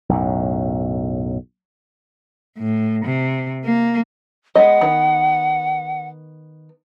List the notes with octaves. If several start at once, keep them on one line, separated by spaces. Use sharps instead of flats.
B1 F#2 A2
A2
C3
A#3
G#3 B3 D#5 F#5
D#3 B3